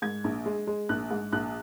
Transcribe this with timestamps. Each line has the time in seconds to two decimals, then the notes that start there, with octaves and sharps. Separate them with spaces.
0.02 G#2 G#6
0.24 A#1
0.46 G#3
0.67 G#3
0.89 A#1 F#6
1.11 G#2
1.32 A#1 F#6